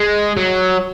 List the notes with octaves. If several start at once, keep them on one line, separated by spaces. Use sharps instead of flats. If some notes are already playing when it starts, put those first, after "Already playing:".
Already playing: G#3
F#3